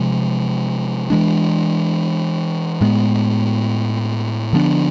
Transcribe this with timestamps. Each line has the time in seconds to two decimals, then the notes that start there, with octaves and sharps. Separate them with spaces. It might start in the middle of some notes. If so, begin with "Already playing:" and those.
Already playing: C3 F3 G#3
1.10 E3 G#3 D4
2.81 A2 G#3 B3
4.53 D3 F3 B3 D4